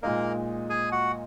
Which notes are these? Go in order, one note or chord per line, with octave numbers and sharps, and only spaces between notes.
A#2 G#3 A#3 D#4 A#4
G#4 G#5
F#4 F#5